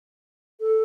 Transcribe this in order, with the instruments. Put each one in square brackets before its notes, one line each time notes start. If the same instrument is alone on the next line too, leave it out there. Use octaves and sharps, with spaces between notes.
[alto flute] A4